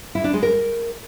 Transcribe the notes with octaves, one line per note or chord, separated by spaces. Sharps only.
E4
D4
G#3
A#4